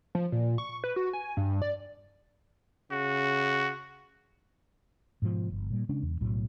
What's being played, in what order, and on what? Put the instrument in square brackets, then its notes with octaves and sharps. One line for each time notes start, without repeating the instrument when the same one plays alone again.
[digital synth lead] F3
A#2
C#6
B4
F#4
G#5
G2
D5
[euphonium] C#3 [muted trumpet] F#4
[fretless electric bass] G#2 B2 D3 F3
G1
A#2 G3
C#3 G#3 C#4 D4
E2
B1 A2 F#3